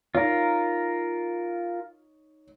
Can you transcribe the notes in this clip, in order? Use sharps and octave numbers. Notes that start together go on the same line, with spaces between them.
D#4 F4 A#4 C#5